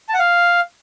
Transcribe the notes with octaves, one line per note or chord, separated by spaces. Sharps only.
A5
F#5
F5